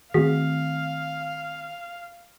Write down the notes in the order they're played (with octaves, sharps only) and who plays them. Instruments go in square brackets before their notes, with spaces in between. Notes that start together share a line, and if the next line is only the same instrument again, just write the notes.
[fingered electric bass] D#3 A3 C4 [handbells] F#4 G#4 B6 [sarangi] F5